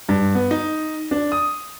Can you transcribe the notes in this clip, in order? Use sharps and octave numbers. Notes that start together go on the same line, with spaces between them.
G2
B3
D#4
D4
D#6